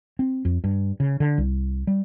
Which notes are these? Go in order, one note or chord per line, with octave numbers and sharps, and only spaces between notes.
C4
F2
G2
C#3
D3
C2
G3